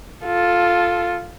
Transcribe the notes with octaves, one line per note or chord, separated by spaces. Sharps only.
F4 A4